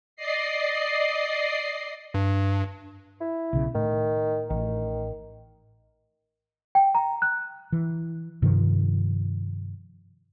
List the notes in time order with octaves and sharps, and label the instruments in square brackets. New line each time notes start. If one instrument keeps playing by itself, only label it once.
[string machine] D5 D#5 C7
[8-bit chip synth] G2
[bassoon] E4
[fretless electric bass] B1 C#3
[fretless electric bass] A2 [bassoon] D#3
[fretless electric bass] A1 [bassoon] D#3
[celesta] G5
A#5
F#6
[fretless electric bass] E3
G2 C3 D#3 F3